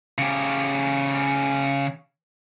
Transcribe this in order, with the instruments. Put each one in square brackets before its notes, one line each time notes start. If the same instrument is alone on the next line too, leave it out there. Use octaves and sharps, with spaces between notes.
[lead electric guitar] C#3 G4